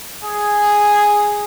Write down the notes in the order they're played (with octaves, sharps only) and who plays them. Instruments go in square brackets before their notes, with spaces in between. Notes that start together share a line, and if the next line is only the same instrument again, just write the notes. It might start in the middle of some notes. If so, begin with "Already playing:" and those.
[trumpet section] G#4